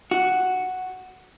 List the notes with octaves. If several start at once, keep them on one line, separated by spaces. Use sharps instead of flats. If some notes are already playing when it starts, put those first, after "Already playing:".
F#4